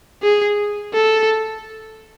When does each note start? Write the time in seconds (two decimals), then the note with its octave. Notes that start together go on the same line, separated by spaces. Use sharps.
0.23 G#4
0.94 A4